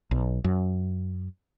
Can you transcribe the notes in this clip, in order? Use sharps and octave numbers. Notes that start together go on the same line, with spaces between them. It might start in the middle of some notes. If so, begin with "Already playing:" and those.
B1
F#2